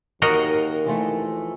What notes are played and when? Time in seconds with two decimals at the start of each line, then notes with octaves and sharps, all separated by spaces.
0.22 D#2 F#4 A#4 D#5
0.86 E3 F3 A3